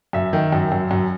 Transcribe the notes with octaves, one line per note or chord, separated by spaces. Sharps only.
F#2 E5
D#3
F#2
F#2
F#2